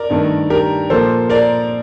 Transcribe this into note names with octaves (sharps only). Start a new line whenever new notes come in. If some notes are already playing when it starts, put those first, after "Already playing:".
Already playing: A#4 D5
G2 D#3 A3
G4 A#4
A#2 F3 A#3 A4 C5
A#4 D5